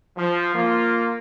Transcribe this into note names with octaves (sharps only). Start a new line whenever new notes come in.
F3
A#3 F4